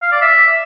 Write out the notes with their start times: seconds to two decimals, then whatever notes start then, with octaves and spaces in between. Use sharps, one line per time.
0.02 F5
0.12 D5
0.22 E5